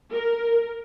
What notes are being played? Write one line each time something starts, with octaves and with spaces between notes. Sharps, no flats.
A#4